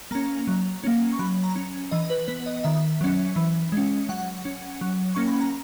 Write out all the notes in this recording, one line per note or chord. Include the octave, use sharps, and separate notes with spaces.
A#3 C#4 A#5
F#3
A#3 C#4
C#6
F#3 B5
A#5
C#4
E3 D#5
B4
B3 B4
D#5
D#3 E5
F#3 C#4
E3
G#3 C#4
F#3 F#5
C#4
F#3
A#3 C#4 C#6
B5
A#5